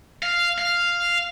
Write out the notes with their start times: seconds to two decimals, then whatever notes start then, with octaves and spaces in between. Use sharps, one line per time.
0.23 F5
0.58 F5